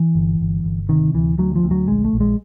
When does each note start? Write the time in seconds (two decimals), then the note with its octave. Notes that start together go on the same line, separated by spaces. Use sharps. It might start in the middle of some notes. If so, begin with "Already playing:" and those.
Already playing: E3
0.15 G1
0.40 G1
0.64 G1
0.89 C3 D#3
1.13 D2 E3
1.38 D2 F#3
1.55 F3
1.63 D2
1.71 F#3
1.88 A#1 G#3
2.04 A3
2.13 A#1
2.20 G#3